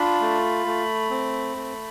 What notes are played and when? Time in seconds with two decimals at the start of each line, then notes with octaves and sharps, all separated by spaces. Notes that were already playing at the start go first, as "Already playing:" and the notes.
Already playing: D4 F4 B5
0.21 A3
0.66 A3
1.10 C4
1.56 A3